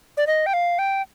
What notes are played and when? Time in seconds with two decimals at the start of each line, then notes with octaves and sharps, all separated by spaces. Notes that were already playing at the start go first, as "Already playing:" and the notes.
0.17 D5
0.27 D#5
0.46 G5
0.54 F5
0.79 G5